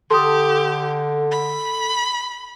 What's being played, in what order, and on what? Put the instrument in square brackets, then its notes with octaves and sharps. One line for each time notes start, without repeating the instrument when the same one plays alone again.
[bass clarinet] D3 [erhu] G4 [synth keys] A4 [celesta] C6 D#6
[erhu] B5